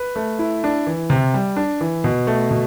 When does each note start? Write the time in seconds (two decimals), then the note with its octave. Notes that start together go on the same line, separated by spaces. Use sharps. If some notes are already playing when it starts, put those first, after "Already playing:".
Already playing: B4
0.16 A3
0.39 E4
0.64 D4
0.87 E3
1.10 C3
1.34 G3
1.57 D4
1.81 E3
2.04 B2
2.27 A3
2.51 B2